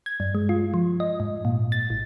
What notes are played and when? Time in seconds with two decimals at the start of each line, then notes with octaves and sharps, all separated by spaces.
0.06 G#6
0.20 G2
0.35 G#3
0.49 F4
0.74 F3
1.00 D#5
1.20 G#2
1.45 A#2
1.72 A6
1.90 A1